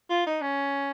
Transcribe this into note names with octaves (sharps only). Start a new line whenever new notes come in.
F4
D#4
C#4